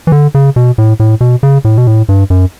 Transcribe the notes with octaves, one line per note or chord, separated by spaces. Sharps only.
E3
D3
C#3
B2
A2
A2
B2
C#3
A2
B2
A2
G2
F#2